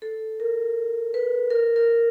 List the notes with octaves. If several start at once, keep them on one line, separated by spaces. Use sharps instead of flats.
A4
A#4
B4
A#4
A#4